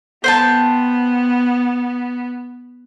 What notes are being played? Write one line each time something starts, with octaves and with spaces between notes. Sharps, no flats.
B3 C5 G5 A5